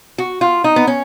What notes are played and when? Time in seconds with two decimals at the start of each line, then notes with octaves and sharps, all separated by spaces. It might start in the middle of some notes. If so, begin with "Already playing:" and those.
0.18 F#4
0.41 F4
0.64 D#4
0.76 B3
0.87 C#4